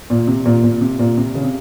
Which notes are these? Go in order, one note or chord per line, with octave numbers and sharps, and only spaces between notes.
A#2
C3
A#2
A#2
C3
A#2
C3
C#3
C3